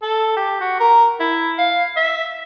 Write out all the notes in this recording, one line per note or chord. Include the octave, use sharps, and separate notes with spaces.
A4
G4
F#4
A#4
E4
F5
E5